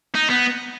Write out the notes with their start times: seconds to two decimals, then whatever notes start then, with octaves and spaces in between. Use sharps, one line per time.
0.15 D#4
0.30 B3